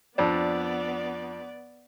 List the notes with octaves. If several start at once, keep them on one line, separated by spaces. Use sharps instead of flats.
F2 B3 D4 D5